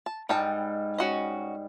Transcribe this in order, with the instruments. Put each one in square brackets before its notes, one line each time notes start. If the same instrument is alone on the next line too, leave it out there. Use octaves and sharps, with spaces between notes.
[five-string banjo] A5
[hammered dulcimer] G#2 G3 [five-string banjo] D#4 G5 A5
[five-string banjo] C#4 F#4 D#5